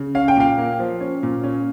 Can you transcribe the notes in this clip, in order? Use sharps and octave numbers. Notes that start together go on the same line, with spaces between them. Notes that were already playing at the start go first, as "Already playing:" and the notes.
Already playing: C#3
C#4 F5
G5
A#2 F5
A#3
F3
C#4
A#2
C#4